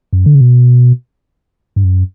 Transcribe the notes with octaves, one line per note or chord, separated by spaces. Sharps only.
F#2
D3
C#3
B2
G2
F#2